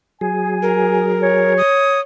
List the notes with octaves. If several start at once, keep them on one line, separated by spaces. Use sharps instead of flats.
F#3 G#4 G#5
A#4
C#5
D#6